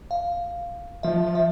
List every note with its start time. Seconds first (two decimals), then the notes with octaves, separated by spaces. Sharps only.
0.11 F5
1.03 F3 E5
1.35 E5